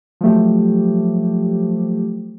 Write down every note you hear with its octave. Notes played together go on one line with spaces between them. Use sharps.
F3 F#3 A3 G4